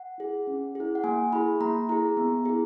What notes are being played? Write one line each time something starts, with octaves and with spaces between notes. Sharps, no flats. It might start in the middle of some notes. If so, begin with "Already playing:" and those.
Already playing: F#5
E4 G#4
C#4
E4 G#4
F#5
A#3 G#5
E4 G#4 B5
A#3 A#5
E4 G#4 A#5
B3
E4 G#4